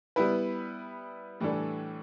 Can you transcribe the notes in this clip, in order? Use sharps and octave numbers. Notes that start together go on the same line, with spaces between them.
G3 B3 E4 B4
A2 E3 G3 D4 A4